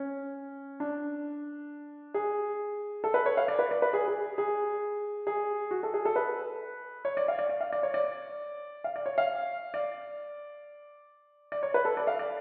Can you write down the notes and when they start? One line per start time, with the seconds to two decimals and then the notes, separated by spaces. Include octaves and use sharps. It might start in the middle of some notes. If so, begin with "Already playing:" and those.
Already playing: C#4
0.80 D4
2.14 G#4
3.04 A4
3.14 B4
3.26 C#5
3.37 F5
3.48 D5
3.59 B4
3.71 D5
3.82 B4
3.93 G#4
4.08 G#4
4.38 G#4
5.27 G#4
5.71 F#4
5.83 A4
5.94 G#4
6.05 A4
6.16 B4
7.05 C#5
7.17 D5
7.28 F5
7.39 D5
7.49 D5
7.61 F5
7.72 D5
7.83 C#5
7.94 D5
8.84 F5
8.96 D5
9.06 C#5
9.18 F5
9.74 D5
11.52 D5
11.63 C#5
11.74 B4
11.85 A4
11.97 D5
12.07 F5
12.19 D5